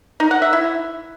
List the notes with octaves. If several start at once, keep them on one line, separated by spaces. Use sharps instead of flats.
D#4
F#5
E5
E4